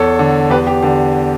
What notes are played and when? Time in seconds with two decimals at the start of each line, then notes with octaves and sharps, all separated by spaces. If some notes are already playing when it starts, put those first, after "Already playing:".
Already playing: E2 A4 C#5
0.19 D3
0.50 E2 G4 B4
0.67 G4
0.82 D3 G4